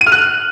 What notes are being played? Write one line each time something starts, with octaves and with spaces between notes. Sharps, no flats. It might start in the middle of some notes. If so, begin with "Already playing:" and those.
D#7
F6
F#6